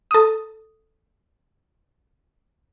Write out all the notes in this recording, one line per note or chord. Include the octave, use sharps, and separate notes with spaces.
A4 D#6